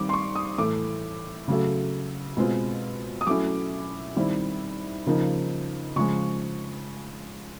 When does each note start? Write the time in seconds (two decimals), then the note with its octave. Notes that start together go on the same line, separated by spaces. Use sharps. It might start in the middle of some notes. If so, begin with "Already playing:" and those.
Already playing: D#3 G3 C4 D6
0.09 C6
0.13 C#6
0.35 D#6
0.58 A2 E3 A3 D6
1.48 C#3 F#3 A3
2.37 B2 G#3 C4 F4
3.21 D#6
3.27 F#3 A3 C#4 E4 D6
4.16 D#3 G3 C4 E4
5.07 C#3 F3 A#3 D#4
5.96 C#3 F3 G#3 C#6